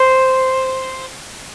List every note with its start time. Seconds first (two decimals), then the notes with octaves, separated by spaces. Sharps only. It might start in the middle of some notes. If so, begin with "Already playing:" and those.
Already playing: C5